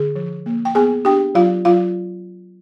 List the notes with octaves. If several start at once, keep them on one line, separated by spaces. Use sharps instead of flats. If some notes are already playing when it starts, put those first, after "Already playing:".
Already playing: D3 G#4
F3
A#3
G5
B3 G#4 G#5
D4 G4 G5
F#3 F4 F5
F#3 F4 F5